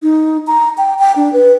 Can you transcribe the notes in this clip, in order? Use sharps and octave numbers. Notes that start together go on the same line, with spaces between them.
D#4
A#5
G5
G5
D4
B4